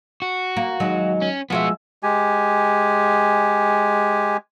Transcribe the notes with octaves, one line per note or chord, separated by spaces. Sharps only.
F#4
A#3
D#2 F#3 G#3
C#4
F3 G#3 B3 F#4 E5
G#3 G4 G#5